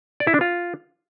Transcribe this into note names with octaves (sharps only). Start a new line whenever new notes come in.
D5
E4
D4
F4